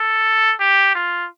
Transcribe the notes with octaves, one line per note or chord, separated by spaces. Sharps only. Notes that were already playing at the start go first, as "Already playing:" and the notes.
Already playing: A4
G4
F4